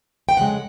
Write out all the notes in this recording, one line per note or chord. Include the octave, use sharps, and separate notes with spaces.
G5
F2 C#3 G#3 F#5